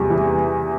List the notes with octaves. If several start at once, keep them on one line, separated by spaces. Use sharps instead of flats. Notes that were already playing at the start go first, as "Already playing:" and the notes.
Already playing: E2 C3 G3
E3